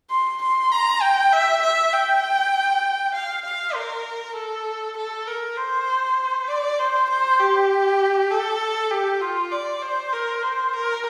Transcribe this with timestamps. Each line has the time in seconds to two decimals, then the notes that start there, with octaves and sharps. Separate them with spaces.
0.10 C6
0.42 C6
0.71 A#5
1.02 G5
1.32 E5
1.62 E5
1.93 G5
3.14 F5
3.45 F5
3.75 A#4
4.36 A4
4.97 A4
5.27 A#4
5.57 C5
6.48 D5
6.79 C5
7.10 C5
7.40 G4
8.31 A4
8.91 G4
9.21 F4
9.52 D5
9.82 C5
10.13 A#4
10.42 C5
10.73 A#4